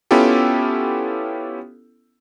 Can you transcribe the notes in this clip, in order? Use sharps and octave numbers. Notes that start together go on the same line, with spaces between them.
B3 C#4 E4 F4 G4 A4